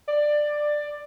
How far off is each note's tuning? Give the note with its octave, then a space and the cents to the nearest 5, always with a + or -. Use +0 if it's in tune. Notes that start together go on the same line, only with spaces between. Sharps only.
D5 +15